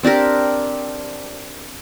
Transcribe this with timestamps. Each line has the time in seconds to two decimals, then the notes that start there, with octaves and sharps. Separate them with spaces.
0.03 C4 D4 G4 A#4